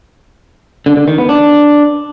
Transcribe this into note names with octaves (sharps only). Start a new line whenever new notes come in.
D3
D3
D#3
B3
D4